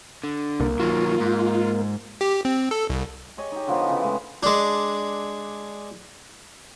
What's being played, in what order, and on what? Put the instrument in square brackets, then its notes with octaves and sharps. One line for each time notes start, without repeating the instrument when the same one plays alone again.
[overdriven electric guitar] D3
[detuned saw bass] C2 [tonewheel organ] A#3
[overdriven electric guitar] D#3 F#3 [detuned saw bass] F4
[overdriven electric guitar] G#2
[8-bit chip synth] G4
C4
A4
C2
[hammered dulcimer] G4 G#4 C#5 D#5
D#4 G4
D3 F3 B3 D#4
C#3 E3
A2 G#3 E5
[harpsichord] G#3 D4